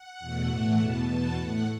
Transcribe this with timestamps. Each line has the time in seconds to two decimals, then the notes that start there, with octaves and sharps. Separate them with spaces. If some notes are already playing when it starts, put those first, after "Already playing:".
Already playing: F#5
0.19 E2 B2 A3
0.48 A2 E3 A3
0.77 E2 B2 B3 A5
1.07 E2 B2 B3 A5
1.36 A2 A3 F#5